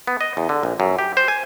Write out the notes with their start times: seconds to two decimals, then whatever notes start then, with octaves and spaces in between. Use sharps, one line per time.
0.07 B3
0.21 D#5
0.37 E2
0.49 D3
0.63 A#1
0.80 F#2
0.99 G4
1.17 C5
1.28 G#5